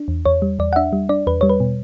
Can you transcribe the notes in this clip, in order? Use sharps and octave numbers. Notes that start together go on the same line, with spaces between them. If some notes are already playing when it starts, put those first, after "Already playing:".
Already playing: D4
E2
E2 C#5
G3
E2 D5
F#5
D4 E5
G3
D4 D5
E2 B4
G3 C#5
B4
B2